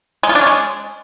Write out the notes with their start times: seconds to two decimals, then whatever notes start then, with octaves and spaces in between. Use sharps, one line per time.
0.23 G#3
0.29 F4
0.35 D4
0.41 C#4
0.47 G#3